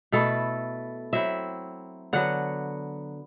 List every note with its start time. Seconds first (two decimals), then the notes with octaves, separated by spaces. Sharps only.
0.12 B2 A3 E4 A4
1.13 F#3 C4 E4 E5
2.13 D3 F#3 B3 F#5